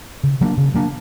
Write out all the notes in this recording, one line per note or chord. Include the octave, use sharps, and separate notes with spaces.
C#3
F#3 A#3 D4
C#3
F#3 A#3 D4